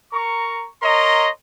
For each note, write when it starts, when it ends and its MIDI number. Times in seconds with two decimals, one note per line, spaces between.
0.13 0.69 70
0.13 0.69 82
0.13 0.69 85
0.82 1.30 70
0.82 1.30 73
0.82 1.30 75
0.82 1.30 82
0.82 1.30 84